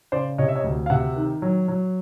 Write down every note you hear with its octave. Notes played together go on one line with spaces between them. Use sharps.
C#3 C5 D5
C3 C#5 D#5
E5
C#5 D#5
D2
F5
C3 E5 F#5
D#3
F#3
F#3